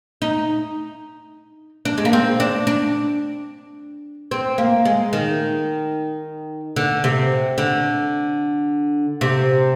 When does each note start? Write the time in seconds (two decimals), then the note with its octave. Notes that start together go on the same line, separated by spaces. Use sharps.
0.22 D#4
1.85 D4
1.98 G#3
2.05 A#3
2.13 C4
2.40 D4
2.67 D4
4.31 C4
4.58 A#3
4.85 G#3
5.13 D#3
6.76 D3
7.04 C3
7.58 D3
9.21 C3